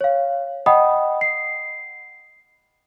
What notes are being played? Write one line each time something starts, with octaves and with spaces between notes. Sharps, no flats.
C#5 F5
D#5 F#5 G5 B5 D#6
C7